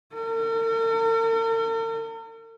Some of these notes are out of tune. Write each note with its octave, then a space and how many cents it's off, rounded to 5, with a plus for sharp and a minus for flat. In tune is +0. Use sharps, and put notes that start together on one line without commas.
A#4 -45